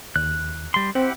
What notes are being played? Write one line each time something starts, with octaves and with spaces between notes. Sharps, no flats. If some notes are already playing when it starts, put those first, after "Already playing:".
D#2 F#6
G3 C6
C4 E4 G4 F#5